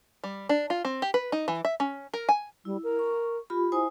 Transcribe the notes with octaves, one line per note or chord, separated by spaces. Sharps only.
G3
D4
F4
C4
G4
B4
D#4
E3
E5
C#4
A#4
G#5
G3 E4
A#4
C#6
F4 G4 B5
E4 C5 G#5 D#6